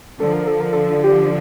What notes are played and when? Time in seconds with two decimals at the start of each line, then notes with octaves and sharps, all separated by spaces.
0.20 D3 F3 A4
0.33 A#4
0.47 A4
0.60 A#4
0.73 A4
1.04 G4